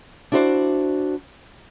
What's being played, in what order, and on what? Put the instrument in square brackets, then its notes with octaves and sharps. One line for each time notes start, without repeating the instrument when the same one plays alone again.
[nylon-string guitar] D4 E4 F#4 B4 C5 D5